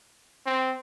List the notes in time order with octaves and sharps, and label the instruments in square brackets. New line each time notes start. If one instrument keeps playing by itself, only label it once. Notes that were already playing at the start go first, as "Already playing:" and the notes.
[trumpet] C4